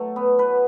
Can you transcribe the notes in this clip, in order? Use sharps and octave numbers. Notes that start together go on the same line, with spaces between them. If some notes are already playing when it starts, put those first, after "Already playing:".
Already playing: B2 F#3 A3
B3
B2 B4